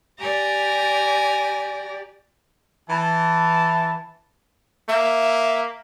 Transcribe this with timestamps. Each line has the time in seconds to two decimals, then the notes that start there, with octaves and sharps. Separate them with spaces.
0.19 G4 D5 G#5 A#5
2.90 E3 A5
4.89 A#3 E5